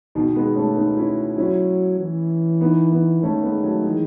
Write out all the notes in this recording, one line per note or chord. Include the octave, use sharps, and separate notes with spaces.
B2 D#3
G#3 B3
A3 C#4
B3 D#4
C#4 E4
F#3 C#4 E4
E3
B3 D#4
B3 D#4
D#3 A3 C#4
G#3 B3
F#3 A3
E3 G#3